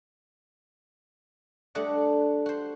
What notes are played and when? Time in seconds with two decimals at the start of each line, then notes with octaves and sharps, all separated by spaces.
1.75 G3 A3 D4 D#5 F#5
2.46 F#4 C5